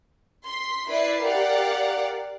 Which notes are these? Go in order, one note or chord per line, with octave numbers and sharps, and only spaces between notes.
C6 B6 C7
E4 B4 D5 E5 B5 C7
G4 A#4 D5 F5 F#5